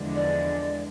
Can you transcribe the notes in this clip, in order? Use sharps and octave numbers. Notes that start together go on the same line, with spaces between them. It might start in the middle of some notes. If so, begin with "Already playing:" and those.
Already playing: E2 D3 F3 G#3 D4
D5